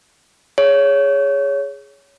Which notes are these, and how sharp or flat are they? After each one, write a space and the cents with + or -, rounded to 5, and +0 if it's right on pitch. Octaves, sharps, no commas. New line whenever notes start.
G#4 +0 C#5 +15